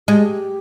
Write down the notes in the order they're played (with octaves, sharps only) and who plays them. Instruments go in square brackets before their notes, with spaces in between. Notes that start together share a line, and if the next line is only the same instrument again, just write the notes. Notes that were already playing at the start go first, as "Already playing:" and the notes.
[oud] G#3 [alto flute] G4